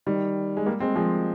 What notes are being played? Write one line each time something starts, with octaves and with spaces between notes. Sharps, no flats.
D#3 G3
G#3
G3 A#3
G#3 C4
F3 G#3